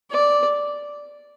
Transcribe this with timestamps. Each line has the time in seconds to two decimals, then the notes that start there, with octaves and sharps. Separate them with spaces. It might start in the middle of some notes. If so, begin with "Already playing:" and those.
0.11 D5